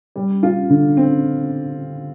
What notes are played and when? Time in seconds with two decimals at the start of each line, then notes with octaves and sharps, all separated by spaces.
0.16 G3
0.43 F4
0.70 D3
0.97 C4